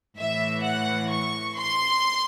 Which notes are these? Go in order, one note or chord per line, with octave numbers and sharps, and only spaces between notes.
A2 E3 E5
F#5
C#6
C6